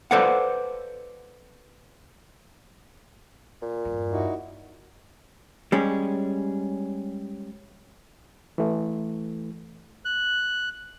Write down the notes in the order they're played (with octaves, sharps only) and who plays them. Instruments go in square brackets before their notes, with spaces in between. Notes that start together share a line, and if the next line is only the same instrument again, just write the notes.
[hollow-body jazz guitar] A4 B4 C5 D5 F5 F#5
[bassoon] A#2
[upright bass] E2 G2
[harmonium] D#4 E4 F#4
[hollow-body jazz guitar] G3 G#3 C#4
[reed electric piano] E3 A3
[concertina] F#6